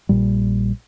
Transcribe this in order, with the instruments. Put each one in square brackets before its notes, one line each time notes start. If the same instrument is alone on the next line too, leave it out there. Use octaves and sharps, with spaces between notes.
[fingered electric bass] A#1 A#2 G3